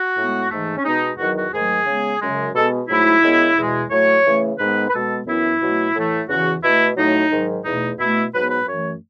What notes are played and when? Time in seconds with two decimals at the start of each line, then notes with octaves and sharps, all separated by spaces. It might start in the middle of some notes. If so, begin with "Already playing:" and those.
Already playing: F#4
0.17 A2 G#3 B3
0.51 G#2 E3 A3
0.77 C#4
0.84 B2 G#3 B3 D#4
1.18 E2 D#3 F#3 F#4
1.35 F#4
1.52 G#2 D#3 F#3 A3 G#4
1.86 C#3 G#3 B3
2.20 F#2 C#3 G#3
2.54 B2 G#3 B3 A4
2.89 G#2 F#3 A3 E4
3.23 F#2 C#3 G#3 B3
3.57 E2 B2 G#3
3.91 A2 F#3 A3 C#5
4.25 C#3 E3 A3
4.59 G#2 D#3 G#3 B3 B4
4.88 B4
4.92 B2 G#3 B3 A4
5.26 F#2 E3 B3 E4
5.61 B2 F#3 A3
5.94 A2 E3 A3
6.29 E2 C#3 E3 F#4
6.63 B2 A3 E4
6.97 A2 F#3 A3 D#4
7.31 G#2 D#3 F#3
7.65 E2 B2 A3 D#4
7.98 B2 A3 E4
8.32 G#2 F#3 B3 B4
8.50 B4
8.67 F#2 E3 A3 C#5